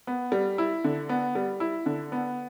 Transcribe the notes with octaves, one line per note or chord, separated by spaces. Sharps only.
B3
G3
E4
D3
B3
G3
E4
D3
B3